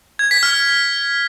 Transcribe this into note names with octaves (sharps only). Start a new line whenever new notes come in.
G#6
B6
F6